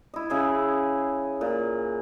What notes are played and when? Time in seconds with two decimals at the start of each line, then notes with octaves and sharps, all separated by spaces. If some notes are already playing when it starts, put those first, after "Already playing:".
0.14 E4 D#5
0.30 C#3 G#4 E5
1.41 A#2